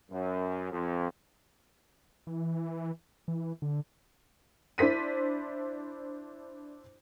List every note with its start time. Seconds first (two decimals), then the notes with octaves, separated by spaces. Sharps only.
0.11 F#2
0.71 F2
2.27 E3
3.28 E3
3.62 D3
4.78 D4 E4 C5 B6 D#7